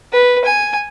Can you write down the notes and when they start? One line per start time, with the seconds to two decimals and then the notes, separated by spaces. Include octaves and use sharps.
0.13 B4
0.45 G#5